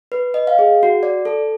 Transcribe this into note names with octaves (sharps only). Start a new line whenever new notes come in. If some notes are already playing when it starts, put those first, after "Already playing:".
B4
D#5
F5
G#4
F#4
D5
A4